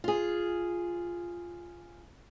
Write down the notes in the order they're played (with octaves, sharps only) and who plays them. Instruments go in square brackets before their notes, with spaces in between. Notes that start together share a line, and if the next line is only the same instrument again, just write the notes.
[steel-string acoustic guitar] F4 G#4